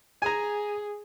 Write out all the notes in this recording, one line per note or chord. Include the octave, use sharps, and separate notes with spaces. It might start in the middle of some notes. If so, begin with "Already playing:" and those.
G#4 G#5 A#5